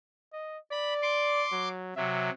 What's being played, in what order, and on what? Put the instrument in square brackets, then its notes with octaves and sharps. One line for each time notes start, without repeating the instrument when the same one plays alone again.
[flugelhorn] D#5
[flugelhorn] D5 [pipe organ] B5
[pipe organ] C6 D6
[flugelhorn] F#3
[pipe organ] C3 F#3 [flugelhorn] E5